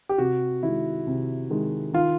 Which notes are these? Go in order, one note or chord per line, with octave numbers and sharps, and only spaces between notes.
G4
C3 F#4
D#3 G#3 E4
C3
D#3 G#3
D#3 F4